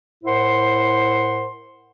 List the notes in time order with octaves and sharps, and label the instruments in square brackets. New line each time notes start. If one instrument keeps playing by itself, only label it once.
[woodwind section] A2 E4 A#4 C5 F#5 C6